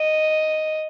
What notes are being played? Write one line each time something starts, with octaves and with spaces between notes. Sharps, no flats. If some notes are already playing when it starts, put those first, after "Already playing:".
Already playing: D#5